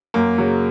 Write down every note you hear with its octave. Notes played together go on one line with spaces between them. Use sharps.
F#2 A#3
C#3 F#3